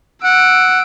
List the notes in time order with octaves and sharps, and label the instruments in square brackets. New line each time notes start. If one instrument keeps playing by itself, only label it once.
[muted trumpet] F#5 [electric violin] E6 D7